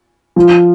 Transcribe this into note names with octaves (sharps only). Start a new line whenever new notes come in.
F3